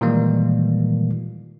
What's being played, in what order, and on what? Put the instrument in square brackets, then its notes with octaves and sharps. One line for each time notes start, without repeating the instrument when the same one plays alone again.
[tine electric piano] A#2 D#3 E3 G3 G#3 A#3